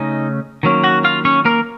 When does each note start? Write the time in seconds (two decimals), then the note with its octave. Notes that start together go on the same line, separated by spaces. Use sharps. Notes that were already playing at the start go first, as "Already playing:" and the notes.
Already playing: C#3 A3 C#4 D#4 D#5
0.63 D#3 F#3 A#3 C#4
0.84 F#4 F#5
1.04 F4 F5
1.25 C#4 C#5
1.45 A#3 A#4